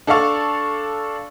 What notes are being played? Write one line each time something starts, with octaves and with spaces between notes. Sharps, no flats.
D4 A4 D5 F5 C#6